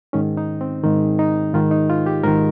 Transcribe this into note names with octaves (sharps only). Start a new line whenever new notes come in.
G#2 D#3 C#4
D#4
C4
G#2 D#3
D#4
G#2 D#3 F4
D#4
F4
G4
G#2 D#3 A#4